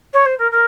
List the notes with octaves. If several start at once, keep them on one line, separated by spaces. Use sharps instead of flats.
C#5
C5
A#4
A#4